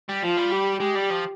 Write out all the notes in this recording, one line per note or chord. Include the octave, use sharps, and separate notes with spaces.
G3
F3 F4
G3
G4
G#3 G4
G3
F3